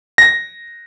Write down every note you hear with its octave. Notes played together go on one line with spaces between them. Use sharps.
A#6